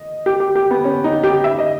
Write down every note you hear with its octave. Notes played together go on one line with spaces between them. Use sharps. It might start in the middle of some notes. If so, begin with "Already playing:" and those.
Already playing: D#5
G4
G4
G4
B3
C#4
D#4
G4
E5
D#5